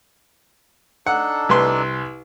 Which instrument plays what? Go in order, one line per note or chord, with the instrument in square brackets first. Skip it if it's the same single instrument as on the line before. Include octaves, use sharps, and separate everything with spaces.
[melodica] D4 D#4 A4 [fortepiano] F#5
[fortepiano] C2 B4 C6